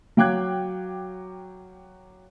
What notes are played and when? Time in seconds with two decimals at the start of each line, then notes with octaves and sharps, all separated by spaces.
0.17 F#3 F5 G5 D6 F#6 G#6